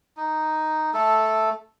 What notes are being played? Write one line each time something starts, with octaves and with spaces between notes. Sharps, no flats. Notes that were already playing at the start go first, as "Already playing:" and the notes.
D#4
A3 A4